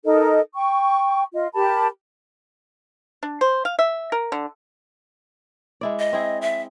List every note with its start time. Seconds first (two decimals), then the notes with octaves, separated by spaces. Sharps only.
0.05 D#4 A4 A#4 D#5
0.54 G5 C#6
1.33 F4 D#5
1.54 G4 A#4 A5 B5
3.23 D4
3.41 C5
3.65 F5
3.79 E5
4.12 A#4
4.32 D3
5.81 G#3 E4 D5
5.99 D#5
6.13 C4 E4 G#4
6.42 E5